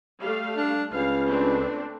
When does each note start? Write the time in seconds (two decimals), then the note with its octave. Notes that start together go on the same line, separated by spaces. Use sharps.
0.21 G3 A3 F5
0.57 D4
0.94 C#2 B4 F5
1.26 A3 C4 D4